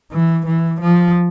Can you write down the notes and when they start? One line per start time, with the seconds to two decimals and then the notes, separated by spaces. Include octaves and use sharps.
0.12 E3
0.47 E3
0.81 F3